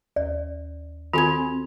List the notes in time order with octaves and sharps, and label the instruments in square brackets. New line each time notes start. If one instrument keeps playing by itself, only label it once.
[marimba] D#2 [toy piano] D5
[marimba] D#3 G#5 G#6 [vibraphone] C4 [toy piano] F4 F#4 A4